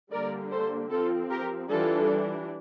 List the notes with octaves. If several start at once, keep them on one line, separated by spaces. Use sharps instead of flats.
D3 G3 A#3 D4 A#4 D5
A4 C5
F3 C4 F4 A4
G4 A#4
E3 G3 D4 F4 A4